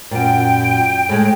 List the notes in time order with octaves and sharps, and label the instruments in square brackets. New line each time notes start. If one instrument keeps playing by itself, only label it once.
[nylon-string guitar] F#2 A#2 [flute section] G5
[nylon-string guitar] A2 G#3